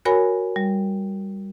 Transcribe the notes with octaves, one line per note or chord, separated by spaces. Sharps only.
F#4 A#4 C#5 G#5 B5
G3